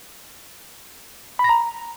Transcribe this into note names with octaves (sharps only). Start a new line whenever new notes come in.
B5
A#6
A#5